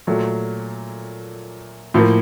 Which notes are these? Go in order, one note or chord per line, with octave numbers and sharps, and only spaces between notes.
A#2 F#3 A3
A2 F3 A#3